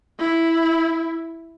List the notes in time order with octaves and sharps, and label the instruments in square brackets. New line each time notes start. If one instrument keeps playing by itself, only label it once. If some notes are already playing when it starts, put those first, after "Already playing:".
[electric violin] E4